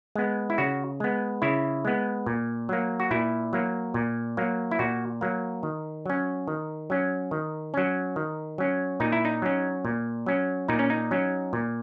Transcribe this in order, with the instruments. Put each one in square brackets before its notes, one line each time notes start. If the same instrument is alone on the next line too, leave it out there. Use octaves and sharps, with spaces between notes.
[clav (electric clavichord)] G#3 B3
E4
C#3 F#4
G#3 B3
C#3 E4
G#3 B3
A#2
F#3 A#3
F#4
A#2 E4
F#3 A#3
A#2
F#3 A#3
E4
A#2 F#4
F#3 A#3
D#3
F#3 C#4
D#3
F#3 C#4
D#3
F#3 C#4
D#3
F#3 C#4
A#2 D#4
E4
D#4
F#3 C#4
A#2
F#3 C#4
A#2 D#4
C#4
D#4
F#3 C#4
A#2